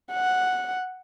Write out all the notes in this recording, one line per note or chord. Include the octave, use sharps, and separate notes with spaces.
F#5